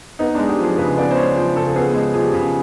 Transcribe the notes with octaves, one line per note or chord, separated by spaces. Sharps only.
B3 D#4
G#3 D4
G4
F3 G#4
C#3 B4
B3 D5
C5
G#3 C#5
F3 C5
C#3 A4
B3 G#4
G#3 G#4
F3 G#4
G4
C#3